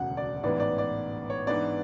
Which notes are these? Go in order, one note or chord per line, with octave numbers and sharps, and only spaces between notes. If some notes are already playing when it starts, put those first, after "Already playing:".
Already playing: E1 D2 C#3 F#5
D5
A1 G#2 E3 B3 D5
D5
D5
C#5
G#2 E3 B3 D4 D5